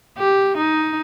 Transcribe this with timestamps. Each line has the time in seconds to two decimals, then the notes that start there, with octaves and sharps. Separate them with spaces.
0.18 G4
0.57 D#4